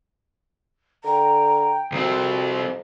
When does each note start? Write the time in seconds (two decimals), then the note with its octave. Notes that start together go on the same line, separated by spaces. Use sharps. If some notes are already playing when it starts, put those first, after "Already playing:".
1.04 D3 G5 A#5
1.92 C2 F2 C4 F#4